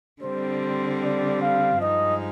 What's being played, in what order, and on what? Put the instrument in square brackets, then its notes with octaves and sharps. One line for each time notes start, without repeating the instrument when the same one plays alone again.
[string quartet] D3 G3 C4 [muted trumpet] C5
[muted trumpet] D5
F5
[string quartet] G2 F3 G#3 D#4 [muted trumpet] D#5